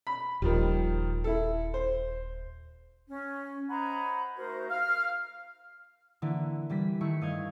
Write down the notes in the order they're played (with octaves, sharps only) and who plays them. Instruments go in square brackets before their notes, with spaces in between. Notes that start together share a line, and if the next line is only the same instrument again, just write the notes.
[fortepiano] B5
[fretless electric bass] D#1 [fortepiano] D#3 F3 G3
[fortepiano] E4 A4
C5
[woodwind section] C#4
C5 D#5 F#5 G#5 A#5 B5
A3 D#4 F#4 A#4 C5
F5 F6
[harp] D3 E3 A#3 E4
E3 G3 B6
D#3 A3 E4 C#6
G2 D#5 F5 G#6